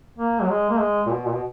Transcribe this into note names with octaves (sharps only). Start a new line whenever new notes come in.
A#3
F#3
G#3
A#3
G#3
A#2
B2
A#2
B2